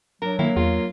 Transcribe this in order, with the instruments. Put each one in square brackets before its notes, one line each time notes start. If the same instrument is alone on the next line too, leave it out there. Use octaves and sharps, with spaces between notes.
[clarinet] F#3 [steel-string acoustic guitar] D4 [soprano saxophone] A#4
[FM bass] D#3 [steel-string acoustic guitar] A#3 [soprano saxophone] E4
[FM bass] E2 [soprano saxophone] F4